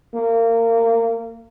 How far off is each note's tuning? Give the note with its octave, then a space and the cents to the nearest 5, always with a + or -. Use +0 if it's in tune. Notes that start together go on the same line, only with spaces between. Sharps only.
A#3 -25